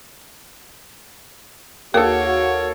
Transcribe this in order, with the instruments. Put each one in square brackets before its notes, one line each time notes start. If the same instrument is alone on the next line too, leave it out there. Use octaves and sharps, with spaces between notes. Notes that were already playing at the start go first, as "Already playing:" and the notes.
[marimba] D#2 G#4 D#6 [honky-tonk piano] A#3 A4 [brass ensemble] F#4 C#5